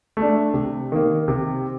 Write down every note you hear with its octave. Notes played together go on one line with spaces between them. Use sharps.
A3
D4
C3
D#3 A#3
C3